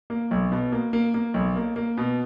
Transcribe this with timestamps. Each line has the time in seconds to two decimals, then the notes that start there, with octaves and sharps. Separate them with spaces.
0.10 A#3
0.31 B1
0.52 B2
0.72 A#3
0.93 A#3
1.14 A#3
1.34 B1
1.56 A#3
1.76 A#3
1.98 B2